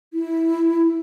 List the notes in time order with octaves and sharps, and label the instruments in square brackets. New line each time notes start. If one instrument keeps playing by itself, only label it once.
[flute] E4